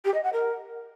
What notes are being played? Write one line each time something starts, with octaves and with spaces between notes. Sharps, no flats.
G4
D#5
F#5
A#4